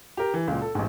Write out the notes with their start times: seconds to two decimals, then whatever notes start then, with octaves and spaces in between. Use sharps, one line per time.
0.17 G4 A#4
0.34 E3
0.48 C#2 A#2
0.62 A4
0.75 A1 G#2